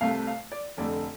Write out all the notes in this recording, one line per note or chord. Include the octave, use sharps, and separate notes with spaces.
C2 C3 A3 F5
F5
D5
F1 F2 D3 A3 D5